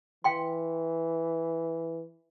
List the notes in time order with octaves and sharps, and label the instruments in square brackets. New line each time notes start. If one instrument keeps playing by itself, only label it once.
[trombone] E3 [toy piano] F5 G5 C6